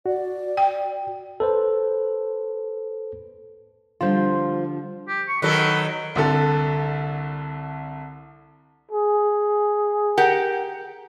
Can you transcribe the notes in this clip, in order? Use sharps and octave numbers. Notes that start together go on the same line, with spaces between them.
F#4 D5
G5
A4 B4 C5
D3 F3 G3 F4 C5
G4
C#6
D#3 F#3 A4 B4
C2 D3 A4
G#4
G4 A#4 F#5